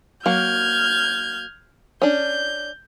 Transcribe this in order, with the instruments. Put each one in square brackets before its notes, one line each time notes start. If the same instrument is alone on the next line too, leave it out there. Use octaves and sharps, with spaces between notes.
[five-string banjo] F#3 A#3 [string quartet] F6 G6 G#6
[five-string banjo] C#4 D4 [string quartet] G6